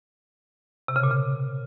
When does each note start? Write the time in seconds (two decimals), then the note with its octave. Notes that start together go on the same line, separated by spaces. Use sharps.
0.88 C3
0.96 C#3
1.03 A#2
1.11 C#3